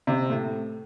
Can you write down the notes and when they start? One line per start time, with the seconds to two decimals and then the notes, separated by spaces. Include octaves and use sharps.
0.07 C3
0.30 A2